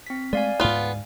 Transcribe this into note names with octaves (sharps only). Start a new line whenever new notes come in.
C4 B6
G#3 A3 D5 F5 G#5
D2 G#2 B3 F4